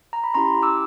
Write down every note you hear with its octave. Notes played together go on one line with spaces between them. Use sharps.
A#5
B5
C#4 E4 G4 A#5 C6
D6 E6